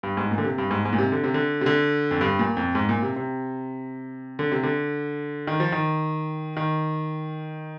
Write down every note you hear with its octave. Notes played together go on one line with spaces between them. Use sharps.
G2
G#2
A#2
D3
C3
G2
G#2
G#2
A#2
C3
D3
C3
D3
C3
D3
F2
G2
A#2
F2
G#2
A#2
C3
C3
D3
C3
D3
D#3
F3
D#3
D#3